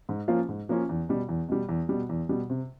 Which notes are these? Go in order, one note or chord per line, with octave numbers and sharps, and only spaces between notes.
G#2
F3 A#3 C#4 F4
G#2
F3 A#3 C#4 F4
E2
B2 G3
E2
B2 G3
E2
B2 G3
E2
B2 G3
C3